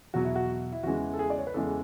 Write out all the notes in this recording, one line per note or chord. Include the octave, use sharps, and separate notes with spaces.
E2 B2 F#3 F#4
E4
F#4
E4
E2 C#3 E3 G#3 F#4
A4
G#4
D5
C#5
B4
E2 C#3 E3 G#3 A4